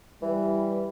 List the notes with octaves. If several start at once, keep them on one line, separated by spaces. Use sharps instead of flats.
E3 G3